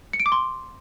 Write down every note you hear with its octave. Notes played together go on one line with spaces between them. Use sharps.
C#7
D7
D6
C6